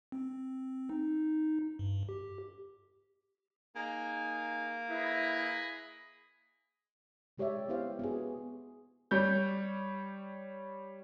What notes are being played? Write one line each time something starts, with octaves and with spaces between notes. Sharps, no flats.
C4
D#4
G2
G4
A#3 D#4 G#4 G#5
E4 G#4 B4 D#5 B5
C#3 G#3 G4 C#5 D5 E5
B3 E4 G4 C5 F5
B3 F#4 G#4
G3 C#5 G6